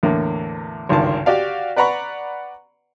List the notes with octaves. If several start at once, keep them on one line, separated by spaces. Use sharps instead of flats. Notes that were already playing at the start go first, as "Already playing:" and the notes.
E2 A2 D3 A#3
G#1 C#2 G2 D3 D#3 A5
F#4 G4 D5 F5
B4 D5 F#5 A#5 B5 C#6